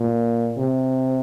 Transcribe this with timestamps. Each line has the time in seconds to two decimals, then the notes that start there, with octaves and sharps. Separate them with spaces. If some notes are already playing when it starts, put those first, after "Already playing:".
Already playing: A#2
0.57 C3